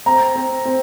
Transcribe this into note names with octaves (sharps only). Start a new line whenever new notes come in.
C4 A#5
C4
C4